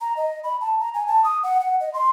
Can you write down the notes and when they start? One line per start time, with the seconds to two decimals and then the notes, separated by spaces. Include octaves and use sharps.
0.01 A#5
0.17 D#5
0.44 B5
0.61 A5
0.80 A#5
0.94 G#5
1.07 A5
1.24 D#6
1.43 F#5
1.60 F#5
1.80 D#5
1.93 C6